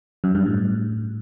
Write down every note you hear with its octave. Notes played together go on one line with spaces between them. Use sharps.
F#2
G2
A2